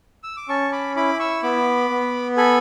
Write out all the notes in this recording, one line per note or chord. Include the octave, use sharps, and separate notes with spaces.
E6
D6
C#4 A5 C#6
B5 D6
E4 B5 D6
C#6 E6
B3 B5 D6
B3
A4 G#5 B5